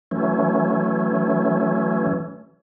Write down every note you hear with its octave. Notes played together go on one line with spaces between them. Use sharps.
E3 F#3 A3 C#4